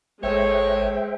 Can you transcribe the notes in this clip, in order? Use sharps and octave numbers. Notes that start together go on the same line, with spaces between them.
G#1 G#3 A4 C5 C#5 E5 G5